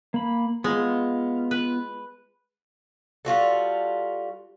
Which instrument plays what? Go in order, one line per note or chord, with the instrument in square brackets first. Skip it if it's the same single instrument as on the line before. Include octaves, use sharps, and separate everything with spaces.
[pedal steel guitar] A#3 B5
[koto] G#3 [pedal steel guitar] B3 F4
[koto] B4
[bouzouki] G3 F4 F#4 A4